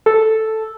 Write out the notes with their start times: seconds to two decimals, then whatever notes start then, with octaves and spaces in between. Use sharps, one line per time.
0.06 A4